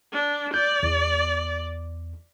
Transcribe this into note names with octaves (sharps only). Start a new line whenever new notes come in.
D4
D5 G6
E2